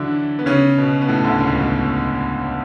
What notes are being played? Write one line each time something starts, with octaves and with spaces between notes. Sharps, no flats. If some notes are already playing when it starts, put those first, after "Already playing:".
Already playing: D3 E3 F#3 D4 E4
B3
C#3 C#4
B2 B3
B3
A2 A3
D2 D3
C#2 C#3
B1 B2